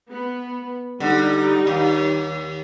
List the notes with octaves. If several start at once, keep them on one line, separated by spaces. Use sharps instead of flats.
B3
D3 G3 D#4
D#2